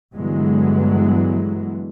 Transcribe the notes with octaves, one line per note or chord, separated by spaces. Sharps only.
G2 D3 E3 F#3 G#3 B3